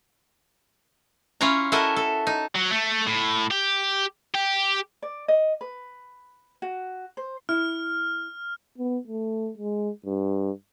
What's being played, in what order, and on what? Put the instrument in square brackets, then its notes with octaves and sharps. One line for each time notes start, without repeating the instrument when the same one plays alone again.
[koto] C#4 E4 F4 C#5 A#5
E4 F#4 A4 A#4 D#5 E5
A4
D#4
[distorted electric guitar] F#3
A3
A2
G4
G4
[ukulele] D5
D#5
B4
F#4
C5
[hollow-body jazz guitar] E4 [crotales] F6
[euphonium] B3
A3
G#3
G2